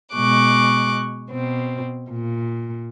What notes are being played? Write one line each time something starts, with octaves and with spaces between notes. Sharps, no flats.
B2 G#3 C#6 D6 F#6
B2 C4
A#2